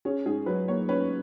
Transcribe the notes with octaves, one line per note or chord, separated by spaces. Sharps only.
C#4 G#4
G#2 G#4
F#3 B4
A#3 C#5
C#4 B4